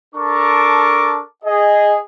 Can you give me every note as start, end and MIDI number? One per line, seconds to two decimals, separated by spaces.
0.15 1.21 62
0.15 1.21 69
0.15 1.21 70
0.15 1.21 81
0.15 1.21 85
0.15 1.21 86
1.44 1.96 68
1.44 1.96 75